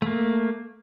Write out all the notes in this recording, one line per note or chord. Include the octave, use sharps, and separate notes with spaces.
A3 A#3